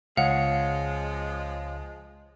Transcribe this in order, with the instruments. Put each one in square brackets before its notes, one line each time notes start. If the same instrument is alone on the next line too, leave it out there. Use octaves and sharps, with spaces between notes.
[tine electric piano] C#2 C#7 [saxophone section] F3 G#3 [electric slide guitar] C#5 F5 [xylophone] F#5